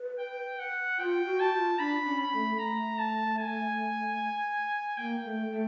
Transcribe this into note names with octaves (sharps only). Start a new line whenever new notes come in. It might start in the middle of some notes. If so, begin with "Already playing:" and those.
Already playing: B4
G5
F#5
F4 G5
F#4
A5
F4
D4 B5
C#4
B5
A3
A3 A#5
A5
G#5
A#3 G5
A3
A3